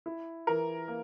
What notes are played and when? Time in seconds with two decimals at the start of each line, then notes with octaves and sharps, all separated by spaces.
0.06 E4
0.47 E3 A#4 A#5
0.88 A#3